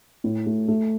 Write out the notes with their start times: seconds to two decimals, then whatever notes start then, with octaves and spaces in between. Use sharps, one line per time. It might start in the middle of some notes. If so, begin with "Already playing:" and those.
0.24 A2
0.46 A3
0.68 A3